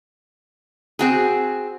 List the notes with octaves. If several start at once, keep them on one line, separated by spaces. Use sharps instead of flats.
C4 F#4 G#4